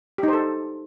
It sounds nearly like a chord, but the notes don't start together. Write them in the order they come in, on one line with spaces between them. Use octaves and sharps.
G4 D#4 C5 A4